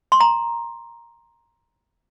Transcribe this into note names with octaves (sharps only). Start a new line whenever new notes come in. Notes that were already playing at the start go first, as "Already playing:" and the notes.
C6
A#5